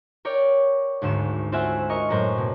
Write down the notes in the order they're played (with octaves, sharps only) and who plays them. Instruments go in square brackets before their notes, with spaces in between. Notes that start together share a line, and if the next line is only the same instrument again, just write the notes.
[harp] A#4 C#5 D5 G5
G#1 D2 G#2 E7
C4 F4 C5 E5 F#5 G#5
A#4 D#5 C#6
F#2 A2 A#4 C5
B2